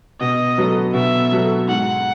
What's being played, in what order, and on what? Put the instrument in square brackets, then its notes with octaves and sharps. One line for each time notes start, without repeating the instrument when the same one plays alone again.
[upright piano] B2 [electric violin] D#5
[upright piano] F#3 B3 F#4 A4
[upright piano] B2 [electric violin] E5
[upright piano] F#3 B3 F#4 A4
[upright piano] G#2 [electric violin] F#5